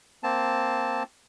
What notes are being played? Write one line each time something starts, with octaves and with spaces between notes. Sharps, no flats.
A#3 C4 A5